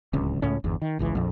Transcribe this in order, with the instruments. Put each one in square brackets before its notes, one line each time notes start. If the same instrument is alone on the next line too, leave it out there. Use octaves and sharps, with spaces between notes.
[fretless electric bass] D1 C#2 C#4
C#2 A2 C#4
G1 E2
D#3
G#1 C#2 E3
A#1 F2